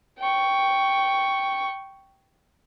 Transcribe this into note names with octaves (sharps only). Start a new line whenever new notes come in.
G5 C#6